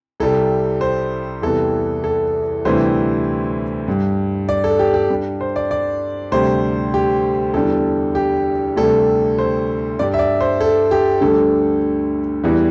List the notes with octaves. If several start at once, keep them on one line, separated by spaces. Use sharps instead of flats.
C2 C3 G3 A4
C5
E2 C3 E3 G3 A4
A4
D2 C3 E3 G3 C5
G2 G3
D5
A4
G4
G4
G2 G3
C5
D5
D5
D2 C3 G3 C5
G4
E2 D3 G3 A4
G4
D2 C3 G3 A4
C5
G2 G3 D5
E5
D5
C5
A4
G4
D2 D3 G3 A4
E2 E3 G3